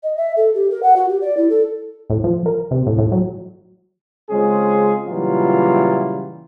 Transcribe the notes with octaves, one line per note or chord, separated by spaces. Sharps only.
D#5
E5
A4
G4
A#4
F#5
F#4
G4
D5
E4
A4
A2
F3
A#4
C3
A2
A2
F#3
C#3 G#3 C4 C#4 F4 G#4
A#2 C#3 E3 F#3 G3 F4